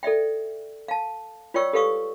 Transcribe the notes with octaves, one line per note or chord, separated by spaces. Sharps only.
A4 D5 E5 G5
F5 A5
F4 C#5 D5 G5 C#6 E6
G4 A4 B4 F5 C#6 D#6